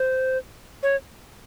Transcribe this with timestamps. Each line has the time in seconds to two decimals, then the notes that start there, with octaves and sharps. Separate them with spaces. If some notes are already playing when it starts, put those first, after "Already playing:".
Already playing: C5
0.83 C#5